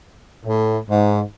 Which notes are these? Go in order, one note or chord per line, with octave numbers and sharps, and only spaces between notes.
A2
G#2